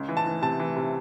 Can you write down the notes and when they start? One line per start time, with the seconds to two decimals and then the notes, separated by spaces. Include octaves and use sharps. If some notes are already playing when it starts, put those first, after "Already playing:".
Already playing: C#2
0.09 E3
0.17 A5
0.26 E3
0.42 C3 A5
0.60 E3
0.76 C3